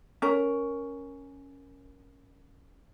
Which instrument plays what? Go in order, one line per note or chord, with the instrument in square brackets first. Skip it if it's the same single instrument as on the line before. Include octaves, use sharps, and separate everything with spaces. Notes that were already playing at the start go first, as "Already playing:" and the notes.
[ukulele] C#4 A#4